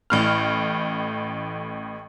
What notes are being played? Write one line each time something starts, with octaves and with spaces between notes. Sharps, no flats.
A1 A2 F6